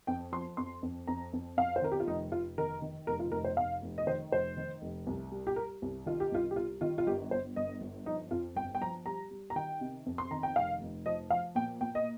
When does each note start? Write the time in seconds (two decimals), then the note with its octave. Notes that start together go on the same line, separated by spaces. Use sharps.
0.07 F2 G5
0.32 F3 C6
0.57 F2 C6
0.83 F2
1.07 F2 A#5
1.33 F2
1.57 F2 F5
1.76 C5
1.82 D#3 A#4
1.92 G4
2.00 F4
2.07 F1 D#4
2.32 F1 F4
2.58 D#3 A#4
2.82 D#3
3.07 F1 A#4
3.20 F4
3.32 F1 A#4
3.44 C5
3.57 F1 F5
3.82 F1
3.98 D#5
4.07 D#3 C5
4.32 F1 C5
4.57 D#3
4.82 F1
5.07 C2
5.32 G3
5.47 G4
5.56 G3 A#4
5.82 C2
6.06 D#3 F4
6.20 G4
6.32 C2 F4
6.51 G4
6.56 G3 F4
6.81 D#3 F4
6.98 F4
7.07 G1 G4
7.31 G1 C5
7.56 G1 D#5
7.81 G1
8.06 F3 D#4
8.31 F2 F4
8.56 G1 G5
8.75 G5
8.81 F3 A#5
9.06 G3 A#5
9.31 G3
9.50 A#5
9.56 D#3 G5
9.81 C3
10.06 F2
10.18 C6
10.31 D#3 A#5
10.43 G5
10.56 F1 F5
10.81 F1
11.06 F3 D#5
11.30 F3 F5
11.55 A#2 G5
11.81 A#2 G5
11.95 D#5